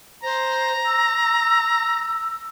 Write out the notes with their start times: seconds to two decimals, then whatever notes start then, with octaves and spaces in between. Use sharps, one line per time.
0.23 C5 A#5
0.85 E6